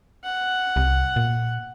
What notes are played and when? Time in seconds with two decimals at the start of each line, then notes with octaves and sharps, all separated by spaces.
0.24 F#5
0.76 C2
1.16 A#2